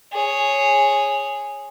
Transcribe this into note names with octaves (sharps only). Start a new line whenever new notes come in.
G#4 C#5